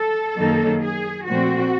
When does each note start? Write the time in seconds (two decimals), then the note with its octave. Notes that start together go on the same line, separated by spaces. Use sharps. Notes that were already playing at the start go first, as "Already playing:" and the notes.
Already playing: A4
0.36 F#2 D#3 F#3 A#3 D#4
0.81 G#4
1.26 A#2 F3 A3 C4 F#4